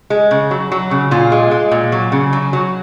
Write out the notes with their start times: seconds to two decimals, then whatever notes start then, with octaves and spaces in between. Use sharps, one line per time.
0.10 G#3
0.31 C#3
0.51 F#3
0.72 F#3
0.91 C#3
1.11 A#2 F4
1.32 G#3
1.51 G#3
1.71 A#2
1.92 F#3
2.12 C#3
2.33 F#3
2.53 F#3